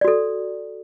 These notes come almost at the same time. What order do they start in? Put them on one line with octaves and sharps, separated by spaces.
D5 F#4 A4